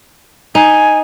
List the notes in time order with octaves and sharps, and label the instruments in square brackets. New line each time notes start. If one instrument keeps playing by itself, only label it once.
[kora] D#4 [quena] G#5